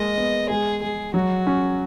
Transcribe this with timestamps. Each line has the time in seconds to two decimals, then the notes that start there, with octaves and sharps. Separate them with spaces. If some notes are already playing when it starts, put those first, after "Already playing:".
Already playing: G#3 A#3 D#5
0.17 B3
0.50 G#3 G#4
0.82 G#3 G#4
1.14 F#3 F#4
1.47 C#4